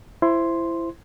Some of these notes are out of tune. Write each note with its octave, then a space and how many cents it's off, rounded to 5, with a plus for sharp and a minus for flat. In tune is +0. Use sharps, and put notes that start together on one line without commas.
E4 +20 C5 +0 C6 +0